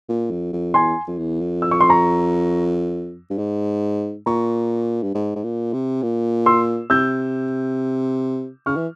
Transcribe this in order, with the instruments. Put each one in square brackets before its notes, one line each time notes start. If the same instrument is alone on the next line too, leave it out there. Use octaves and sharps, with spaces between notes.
[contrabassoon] A#2
F2
F2
[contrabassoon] E2 [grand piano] G#5 C6
[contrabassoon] F2
E2
F2
[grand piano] E6
C#6
C6
A#5 C#6
[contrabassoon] G2
G#2
[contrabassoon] A#2 [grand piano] A#5 C#6
[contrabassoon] G2
G#2
G#2
A#2
C3
A#2
[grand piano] C6 E6
[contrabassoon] C3 [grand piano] E6 G6
[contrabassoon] C#3 [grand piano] C#6 F6
[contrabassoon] E3